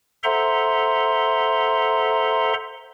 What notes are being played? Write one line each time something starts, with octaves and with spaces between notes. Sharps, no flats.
A4 C5 E5 F#5 A#5 C6